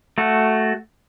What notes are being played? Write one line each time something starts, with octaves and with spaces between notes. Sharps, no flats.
A3 F#4